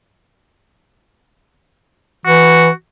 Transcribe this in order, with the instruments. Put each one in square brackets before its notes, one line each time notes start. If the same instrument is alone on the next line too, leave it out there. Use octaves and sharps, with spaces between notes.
[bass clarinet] E3 [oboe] F#4